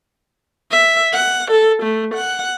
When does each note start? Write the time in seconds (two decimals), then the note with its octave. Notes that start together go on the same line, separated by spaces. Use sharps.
0.71 E5
1.13 F#5
1.51 A4
1.83 A3
2.15 F#5